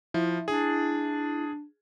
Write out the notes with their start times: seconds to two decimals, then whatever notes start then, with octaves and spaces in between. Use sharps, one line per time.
0.14 F3 E4
0.48 D4 G#4